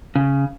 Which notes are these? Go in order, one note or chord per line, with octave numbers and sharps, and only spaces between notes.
C#3